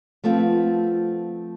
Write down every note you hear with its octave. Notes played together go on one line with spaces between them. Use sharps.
F3 A3 B3 C4 F4